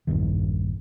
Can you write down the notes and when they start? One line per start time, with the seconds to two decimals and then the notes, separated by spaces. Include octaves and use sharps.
0.07 A#1 E2 G2 D#3